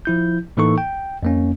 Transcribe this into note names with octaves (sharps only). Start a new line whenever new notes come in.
F3 E4 G6
A2 E3 A#3 D#4 A4 C#6
G5
F2 A#3 C#4